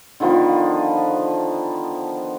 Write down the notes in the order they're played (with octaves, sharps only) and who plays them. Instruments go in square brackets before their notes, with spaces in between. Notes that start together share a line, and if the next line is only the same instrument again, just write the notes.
[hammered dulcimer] D3 D#3 F3 B3